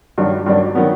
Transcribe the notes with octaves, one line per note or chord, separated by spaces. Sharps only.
G2 D#3 F#3 A#3 D4
G2 D#3 F#3 A#3 D4
D#3 F#3 B3